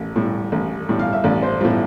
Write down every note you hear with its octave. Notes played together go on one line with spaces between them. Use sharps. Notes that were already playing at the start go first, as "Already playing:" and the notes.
Already playing: A1
A2 G3
A1
A2 G3
F5
E5
A1 D5
C5
A2 G3 F4